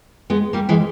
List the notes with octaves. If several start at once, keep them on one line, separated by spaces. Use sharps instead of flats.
G#3 B3
G3 A#3
E3 G#3